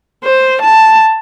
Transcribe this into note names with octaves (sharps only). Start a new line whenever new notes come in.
C5
A5